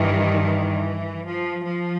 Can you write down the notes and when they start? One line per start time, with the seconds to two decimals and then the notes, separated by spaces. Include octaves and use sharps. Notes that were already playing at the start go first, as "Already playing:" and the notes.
Already playing: G2 D#3 E3
0.41 E3
1.24 F3
1.66 F3